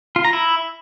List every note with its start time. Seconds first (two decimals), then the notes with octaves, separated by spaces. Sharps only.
0.16 F4
0.25 A#5
0.33 E4